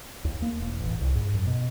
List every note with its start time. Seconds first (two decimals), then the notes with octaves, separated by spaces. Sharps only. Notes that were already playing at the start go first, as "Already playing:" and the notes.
0.25 D#2
0.42 A#3
0.60 E1
0.81 A1
1.01 C2
1.15 G#2
1.34 F#2
1.47 B2